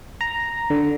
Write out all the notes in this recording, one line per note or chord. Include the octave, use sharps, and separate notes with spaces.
A#5
D3